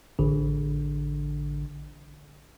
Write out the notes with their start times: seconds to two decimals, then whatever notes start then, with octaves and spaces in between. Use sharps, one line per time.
0.19 A1 D3